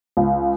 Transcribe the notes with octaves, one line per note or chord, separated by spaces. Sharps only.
C#2